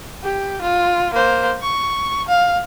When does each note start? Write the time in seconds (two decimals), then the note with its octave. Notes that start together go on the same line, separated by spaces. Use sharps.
0.24 G4
0.62 F4
1.14 A#3 C5
1.62 C#6
2.28 F5